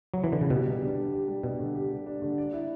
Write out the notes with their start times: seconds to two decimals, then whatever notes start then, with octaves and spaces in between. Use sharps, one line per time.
0.14 F#3
0.24 E3
0.33 D3
0.41 C#3
0.50 B2 G4
0.65 G3
0.81 D4
0.97 D3
1.12 G4
1.28 G3
1.43 B2 D4
1.60 D3
1.75 G4
1.91 G3
2.06 D4
2.22 D3
2.38 D5
2.53 E4